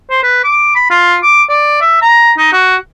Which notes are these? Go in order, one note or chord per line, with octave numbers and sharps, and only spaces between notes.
C5
B4
D6
B5
F4
D6
D5
E5
A#5
D#4
F#4